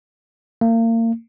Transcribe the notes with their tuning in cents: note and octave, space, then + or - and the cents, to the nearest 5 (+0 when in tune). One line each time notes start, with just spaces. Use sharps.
A#3 -35